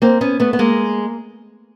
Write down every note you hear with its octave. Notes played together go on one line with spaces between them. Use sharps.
A#3 C4
B3 C#4
A3 B3
B3
G#3 A#3